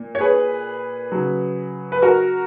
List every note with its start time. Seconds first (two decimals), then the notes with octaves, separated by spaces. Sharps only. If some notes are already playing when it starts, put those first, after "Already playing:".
Already playing: A#2
0.15 C#5
0.20 G#4 B4
1.12 C#3 F#3
1.92 B4
2.02 F#4 A#4